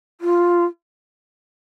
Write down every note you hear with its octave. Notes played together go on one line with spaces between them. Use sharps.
F4